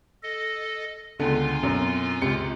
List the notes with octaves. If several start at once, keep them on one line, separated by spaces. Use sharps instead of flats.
A4 D#5
C#2 D3 B3 F4 A4 G#5
F#2 B2 C4 C#4
C#2 C3 C#7